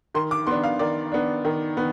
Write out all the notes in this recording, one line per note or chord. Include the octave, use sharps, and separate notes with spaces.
D#3 C6
D6
B3 D4 C6
F5
D#3 D5
B3 D4
D#3
B3